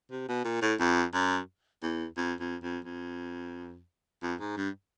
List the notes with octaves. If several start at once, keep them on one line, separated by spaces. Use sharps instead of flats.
C3
B2
A#2
A2
F2
F#2
E2
F2
F2
F2
F2
F2
G#2
G2